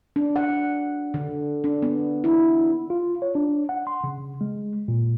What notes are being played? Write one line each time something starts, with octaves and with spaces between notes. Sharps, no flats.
D4
F#5
D3
D4
B3
E4
F4
C#5
D4
F#5
C6
C#3
G#3
A#2